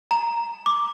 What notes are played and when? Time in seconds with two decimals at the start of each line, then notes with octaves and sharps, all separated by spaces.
0.11 A#5
0.66 D6